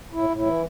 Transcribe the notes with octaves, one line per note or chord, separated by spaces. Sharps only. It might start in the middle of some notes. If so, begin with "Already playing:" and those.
A2 E4
A2
E4
E3